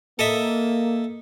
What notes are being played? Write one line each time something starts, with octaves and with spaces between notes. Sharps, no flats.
A#3 A4 D#5 E5